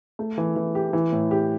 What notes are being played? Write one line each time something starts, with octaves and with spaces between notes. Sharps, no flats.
A3
E3
E3
G4
E3
A2
G4